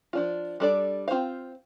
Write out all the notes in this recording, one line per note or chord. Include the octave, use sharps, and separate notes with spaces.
F3 D4 F4
G3 D4 A4 D5
C4 F4 C5 F5